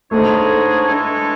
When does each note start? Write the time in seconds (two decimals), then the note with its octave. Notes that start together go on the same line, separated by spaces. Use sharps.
0.11 G#2 G#3 A3 D4 G#4 C#5
0.86 E3 G#3 D4 A4 C#5